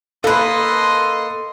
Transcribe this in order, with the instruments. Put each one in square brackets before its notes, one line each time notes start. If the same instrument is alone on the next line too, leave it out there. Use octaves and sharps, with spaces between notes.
[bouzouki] A#3 B4 [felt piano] A4 [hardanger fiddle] D#5 C6